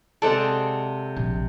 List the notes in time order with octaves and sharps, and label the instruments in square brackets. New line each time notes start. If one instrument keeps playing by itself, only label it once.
[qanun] C3 G#3 D5 [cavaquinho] A4 C5 F#5
[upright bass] A#1